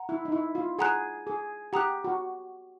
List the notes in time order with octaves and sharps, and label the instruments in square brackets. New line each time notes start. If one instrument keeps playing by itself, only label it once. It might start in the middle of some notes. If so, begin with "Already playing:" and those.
Already playing: [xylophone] F#5 A#5
[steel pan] E4
D#4
E4
F4
[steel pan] G#4 [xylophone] F#5 A#5 D#6 F#6
[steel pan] G#4
[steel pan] G4 [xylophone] F#5 A#5 D#6 F#6
[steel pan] F#4